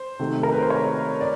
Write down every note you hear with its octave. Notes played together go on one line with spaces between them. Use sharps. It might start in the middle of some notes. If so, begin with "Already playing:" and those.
Already playing: C5
C3 D#3 F#3 A3
A#4
B4
C5
C#5
D5